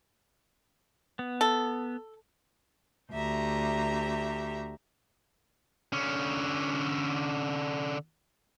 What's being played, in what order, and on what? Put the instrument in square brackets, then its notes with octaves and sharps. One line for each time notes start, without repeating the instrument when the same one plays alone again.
[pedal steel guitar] B3
[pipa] A4
[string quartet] D2 G4 E5 A#5
[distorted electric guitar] D3 C#4